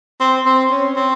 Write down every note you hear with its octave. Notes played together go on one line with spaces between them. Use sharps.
C4
C4
C#4
C4